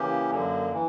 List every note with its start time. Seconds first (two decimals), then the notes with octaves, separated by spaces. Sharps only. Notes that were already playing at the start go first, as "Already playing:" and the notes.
Already playing: C#3 E3 A#3 C#4 G4
0.31 F#2 D3 A#3
0.73 E3